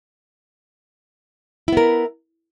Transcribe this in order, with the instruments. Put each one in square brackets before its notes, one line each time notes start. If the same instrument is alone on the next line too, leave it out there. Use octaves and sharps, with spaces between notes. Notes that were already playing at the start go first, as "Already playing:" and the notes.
[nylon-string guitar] E4
B3
A#4